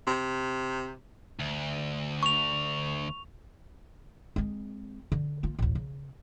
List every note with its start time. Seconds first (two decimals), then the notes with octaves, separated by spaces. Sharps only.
0.07 C3
1.39 D2
2.23 C#6 F7
4.36 G#3 C4
5.12 D3
5.43 A#3 F4
5.59 A1 D2
5.75 C#3